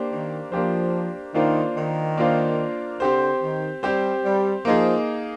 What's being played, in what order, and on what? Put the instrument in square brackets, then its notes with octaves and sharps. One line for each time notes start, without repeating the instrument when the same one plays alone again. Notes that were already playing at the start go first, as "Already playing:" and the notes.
Already playing: [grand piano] A#3 D4 G4 C5
[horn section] D#3
[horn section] F3 [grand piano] A#3 D4 G4 C5
[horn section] D#3 [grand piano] A#3 D4 F4 C5 F5
[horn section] D#3
[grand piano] A#3 D4 F4 C5 F5
[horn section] D3 [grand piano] C4 G4 C5
[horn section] D#3
[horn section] G3 [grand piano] C4 G4 C5
[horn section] G3
[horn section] F3 [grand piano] A#3 D#4 G#4